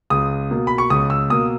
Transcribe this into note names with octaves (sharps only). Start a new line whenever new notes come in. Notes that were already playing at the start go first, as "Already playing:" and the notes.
C#2 D#6
B2 A#3
B5
C#6
C#2 D#6
E6
B2 A#3 D#6